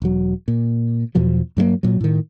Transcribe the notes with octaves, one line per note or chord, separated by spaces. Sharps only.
E1 F#3
A#2
E2 B2 F3 F#3
G2 F#3 G#3 A#3
A#2 F#3
A2 D#3